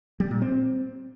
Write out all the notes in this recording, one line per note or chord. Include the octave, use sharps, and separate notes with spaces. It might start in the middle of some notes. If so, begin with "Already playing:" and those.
G3
A#2
C4